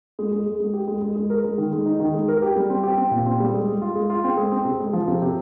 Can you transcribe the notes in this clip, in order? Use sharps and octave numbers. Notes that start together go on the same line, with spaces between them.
G#3
G#3
G#3
G#3
G4
G#3
G#3
G#3
A#4
G#3
D#3
G#3
D#4
D#3
G#3
A#4
G4
G3
C4
G4
C4
A#2
C4
G3
G#3
G#3
F4
G#3
F4
C4
G#3
C4
C3
G#3
F3
C3
C3